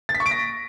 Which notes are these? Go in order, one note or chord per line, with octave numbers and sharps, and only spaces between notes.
A6
B6
C#6
D7
A#6